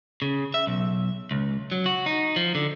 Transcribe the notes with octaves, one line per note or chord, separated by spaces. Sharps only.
C#3
E5
B1
C#2
F#3
F#4
D#4
F3
D3